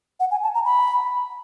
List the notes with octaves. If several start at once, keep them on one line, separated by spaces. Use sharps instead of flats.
F#5
G#5
A5
A#5
B5